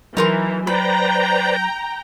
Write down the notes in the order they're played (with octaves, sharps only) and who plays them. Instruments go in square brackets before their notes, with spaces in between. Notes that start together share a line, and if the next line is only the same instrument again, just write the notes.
[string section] E3 [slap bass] F#3 [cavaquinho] D#4 A#4 C6
[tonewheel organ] B4 C5 D5 [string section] G5 A#5 [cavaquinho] B5